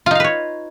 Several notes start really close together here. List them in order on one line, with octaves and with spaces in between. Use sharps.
F4 D#4 F5 B4 C#5